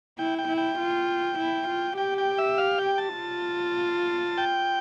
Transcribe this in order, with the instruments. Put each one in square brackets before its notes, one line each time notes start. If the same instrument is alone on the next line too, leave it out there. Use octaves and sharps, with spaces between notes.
[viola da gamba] E4 [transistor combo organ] G5
[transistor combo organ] G5
[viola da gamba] E4
[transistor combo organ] G5
[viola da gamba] F4
E4
F4
[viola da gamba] G4 [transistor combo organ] G5
[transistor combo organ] G5
E5
F5
G5
A5
[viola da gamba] F4
[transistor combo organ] G5